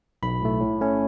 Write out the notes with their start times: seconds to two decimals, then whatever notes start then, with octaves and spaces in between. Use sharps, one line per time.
0.23 B1 B5
0.42 A2 A3
0.61 A2
0.81 A3 C#4